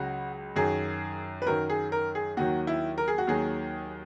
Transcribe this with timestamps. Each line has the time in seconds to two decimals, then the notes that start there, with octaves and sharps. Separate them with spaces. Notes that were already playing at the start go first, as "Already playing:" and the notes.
Already playing: C#2 C#3 F#3 F#4
0.56 F#2 D#3 F#3 G#4
1.42 B4
1.46 F#2 D#3 F#3 A#4
1.70 G#4
1.92 A#4
2.15 G#4
2.37 D#2 D#3 F#3 F#4
2.67 E4
2.98 A#4
3.08 G#4
3.18 F#4
3.27 D#2 D#3 F#3 G#4